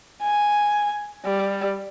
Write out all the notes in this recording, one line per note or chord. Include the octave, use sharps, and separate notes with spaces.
G#5
G3